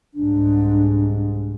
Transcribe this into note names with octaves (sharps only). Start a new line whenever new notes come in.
C2 G#2 D4